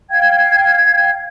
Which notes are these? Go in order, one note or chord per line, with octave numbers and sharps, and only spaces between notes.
F5 G5 G#6